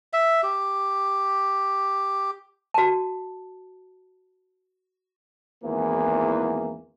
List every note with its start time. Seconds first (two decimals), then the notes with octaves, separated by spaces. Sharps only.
0.13 E5
0.43 G4
2.74 F#4 A5
5.64 G#1 E2 E3 A#3